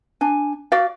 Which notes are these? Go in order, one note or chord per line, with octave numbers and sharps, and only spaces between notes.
D4 G#5
F#4 D5 F5